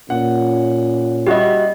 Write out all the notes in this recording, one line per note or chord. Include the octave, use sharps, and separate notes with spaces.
A#2 C#4 F#5
G3 E4 F#4 G4 D#5